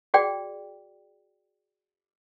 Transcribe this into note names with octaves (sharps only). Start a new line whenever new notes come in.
F#4 G#4 D5 G5